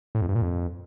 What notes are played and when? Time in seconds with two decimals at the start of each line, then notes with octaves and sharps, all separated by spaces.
0.15 A2
0.22 F2
0.28 G2
0.35 A#2
0.42 F2